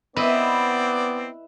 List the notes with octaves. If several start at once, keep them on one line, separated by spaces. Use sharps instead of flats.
B3 C4 E4 B4 D5 D#5